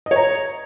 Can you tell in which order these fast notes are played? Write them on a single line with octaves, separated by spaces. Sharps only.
D#5 C#5 A#5